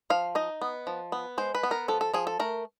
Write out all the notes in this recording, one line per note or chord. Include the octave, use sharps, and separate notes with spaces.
F3 F5
D#4 D#5
B3
F3
B3
G#3 C5
B4
B3
A#4
F3 A4
A4
F3 G#4
A4
A3 A#4